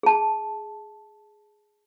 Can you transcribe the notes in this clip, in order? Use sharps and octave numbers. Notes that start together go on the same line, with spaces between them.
G#4 A5